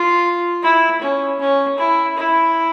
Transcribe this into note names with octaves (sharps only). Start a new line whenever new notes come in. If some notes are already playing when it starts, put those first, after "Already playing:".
Already playing: F4
E4
C#4
C#4
E4
E4